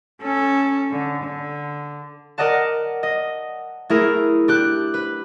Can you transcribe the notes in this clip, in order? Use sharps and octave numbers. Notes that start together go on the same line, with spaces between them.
C#4 A4
D3
D3
A#4 D5 D#5 F#5 A5
D#5
A3 E4 G#4 A#4
D4 G4 F#6
B4